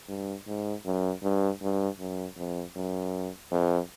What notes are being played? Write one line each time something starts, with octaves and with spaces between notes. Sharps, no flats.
G2
G#2
F#2
G2
G2
F#2
F2
F#2
F2